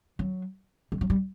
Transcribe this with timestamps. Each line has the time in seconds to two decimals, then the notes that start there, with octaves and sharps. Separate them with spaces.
0.19 F#3
0.92 G3
1.01 F#3
1.10 G3